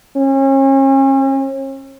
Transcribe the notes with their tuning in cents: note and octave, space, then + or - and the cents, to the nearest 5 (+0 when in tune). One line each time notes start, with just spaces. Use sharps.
C#4 -40